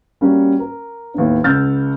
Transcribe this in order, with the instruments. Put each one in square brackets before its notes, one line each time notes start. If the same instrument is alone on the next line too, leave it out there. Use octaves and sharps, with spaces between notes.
[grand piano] G3 A#3 C#4 F#4
A#4
D#2 A2 B3
C#2 F#5 E6 F6 G6 A6